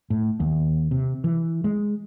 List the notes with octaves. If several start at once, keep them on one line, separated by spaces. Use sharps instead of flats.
A2
D#2
C3
E3
G#3